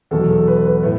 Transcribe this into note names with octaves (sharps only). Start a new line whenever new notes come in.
E2 B2 F#3 A4
A4
B4
B4
A2 B3